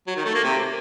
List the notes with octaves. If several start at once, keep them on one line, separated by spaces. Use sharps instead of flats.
F#3
D#3
A3
A#3
C3